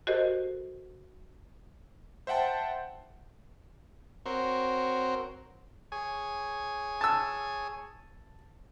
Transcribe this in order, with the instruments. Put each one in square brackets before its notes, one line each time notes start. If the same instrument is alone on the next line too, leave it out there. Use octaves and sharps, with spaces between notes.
[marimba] F#4 G4 A4 A#4 C5 D#5
[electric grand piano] C5 E5 F#5 G5 A5
[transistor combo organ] C4 F#4 A#4 C5 C#5
G#4 C#5 G#5
[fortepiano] A5 E6